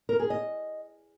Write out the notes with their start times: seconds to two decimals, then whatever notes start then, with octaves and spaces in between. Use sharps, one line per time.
0.09 A#4
0.20 G#4
0.30 D#5